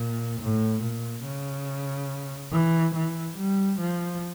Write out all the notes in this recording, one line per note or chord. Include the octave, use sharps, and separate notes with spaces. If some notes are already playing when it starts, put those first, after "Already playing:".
Already playing: A#2
A2
A#2
C#3
E3
E3
G3
F3